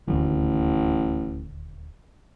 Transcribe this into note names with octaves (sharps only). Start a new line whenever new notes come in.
D#1 A1 D2